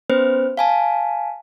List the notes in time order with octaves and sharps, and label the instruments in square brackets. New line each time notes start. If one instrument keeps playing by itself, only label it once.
[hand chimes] B3 C#4 B4 C5
F5 G#5 A5